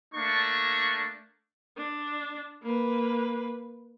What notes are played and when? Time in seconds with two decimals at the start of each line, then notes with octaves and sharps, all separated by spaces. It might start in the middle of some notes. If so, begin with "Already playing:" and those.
0.14 A3 A#3 D4 C#6
1.77 D4
2.63 A#3 B4